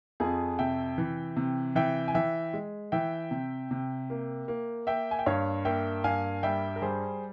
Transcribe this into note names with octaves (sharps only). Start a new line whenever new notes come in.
F2 F4 G#4
C3 E5 G5
E3
C3
E3 E5 G5
G#5
E3 E5 G5
G#3
E3 E5 G5
C3
C3
A#3
A#3
A#3 E5 G5
G#5
G5
G2 C#5 F5
A#3 E5 G5
G2 F5 G#5
G3 E5 G5
A#4
G3 G#4 C5